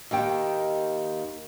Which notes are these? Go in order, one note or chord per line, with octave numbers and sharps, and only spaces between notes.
D#2 D#3 G5